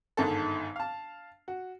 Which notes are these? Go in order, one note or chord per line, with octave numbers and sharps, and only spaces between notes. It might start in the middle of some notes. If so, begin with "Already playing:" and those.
G1 G#2 D#3 A4
F5 A5
F#4